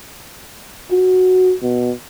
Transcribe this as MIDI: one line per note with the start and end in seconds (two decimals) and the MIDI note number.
0.92 1.55 66
1.62 1.92 47